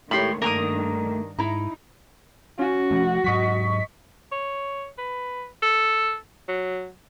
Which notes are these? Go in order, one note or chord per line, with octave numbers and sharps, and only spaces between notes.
A2 D#3 G#3 A3 G4 C#5 B5 C6
G2 D#3 A#3 D4 A#4 A#5 D#6
G#2 D#4 E4 A#5
C#4 F#4
F3 A3
G#2 F#3 D#5 C#6 B6
C#5
B4
A4
F#3